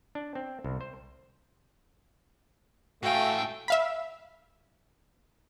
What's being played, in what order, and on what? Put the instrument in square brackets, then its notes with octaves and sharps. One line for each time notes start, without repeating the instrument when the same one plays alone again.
[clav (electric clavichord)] D4
C4
C2
C5
[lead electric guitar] A2 G#5 [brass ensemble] A3 [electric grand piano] F#4 F5 [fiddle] G5
[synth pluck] E5 F5 B5